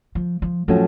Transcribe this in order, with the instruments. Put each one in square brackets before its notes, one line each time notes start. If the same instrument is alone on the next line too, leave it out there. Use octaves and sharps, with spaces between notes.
[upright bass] F3
F3
[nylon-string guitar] A2 F3 A3 C#4 F#4 [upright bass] F#3